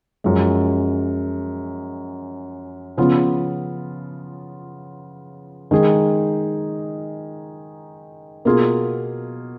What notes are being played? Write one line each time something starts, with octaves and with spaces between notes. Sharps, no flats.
F#2 F3 G#3
C#3 F3 B3 F4
D#3 G#3 D#4 G#4
B2 A#3 F4 G#4